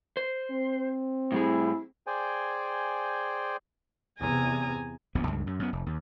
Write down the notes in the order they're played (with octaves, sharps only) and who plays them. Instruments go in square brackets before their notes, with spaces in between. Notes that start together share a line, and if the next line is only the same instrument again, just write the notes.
[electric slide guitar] C5
[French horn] C4
[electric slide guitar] A2 G3 G#4 [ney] E4
[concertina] G#4 C5 D5 G5 G#5
[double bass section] E2 C3 [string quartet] G#5 A#5 D#6
[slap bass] D1 A#1 E2 B3
C#2 G2
F#2
F#2 B3
F1
D#2